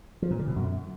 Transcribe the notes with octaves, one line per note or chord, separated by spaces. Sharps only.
F3
A#2
D3
B2
F#2